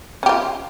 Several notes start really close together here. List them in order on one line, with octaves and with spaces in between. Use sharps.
C#4 G4 F4